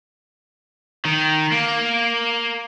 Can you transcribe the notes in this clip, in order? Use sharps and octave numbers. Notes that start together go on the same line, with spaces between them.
D#3
A#3